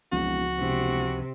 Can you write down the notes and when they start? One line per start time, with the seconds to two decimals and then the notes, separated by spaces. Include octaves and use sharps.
0.12 E1 C#2 F3 C4 F#4
0.59 E1 C3